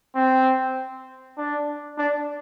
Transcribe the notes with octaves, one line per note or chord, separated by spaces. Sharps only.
C4
D4
D4